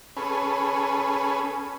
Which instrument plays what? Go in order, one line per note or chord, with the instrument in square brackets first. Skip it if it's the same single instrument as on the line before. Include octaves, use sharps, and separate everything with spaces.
[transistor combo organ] C#4 G#4 A4 B4